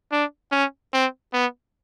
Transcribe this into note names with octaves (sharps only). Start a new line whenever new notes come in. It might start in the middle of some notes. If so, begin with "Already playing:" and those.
D4
C#4
C4
B3